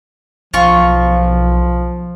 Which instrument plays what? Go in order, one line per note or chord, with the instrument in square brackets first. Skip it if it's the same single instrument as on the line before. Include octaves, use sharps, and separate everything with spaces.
[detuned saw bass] B1 [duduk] F3 [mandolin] F4 C#6